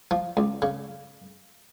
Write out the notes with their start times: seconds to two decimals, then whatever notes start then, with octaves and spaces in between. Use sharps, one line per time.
0.11 F3
0.37 C#2
0.62 C#3